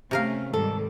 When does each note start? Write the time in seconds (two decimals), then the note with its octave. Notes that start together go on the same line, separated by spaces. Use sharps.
0.11 C3 A3 C#4 A#4 F5
0.53 G#2 D#3 G3 A4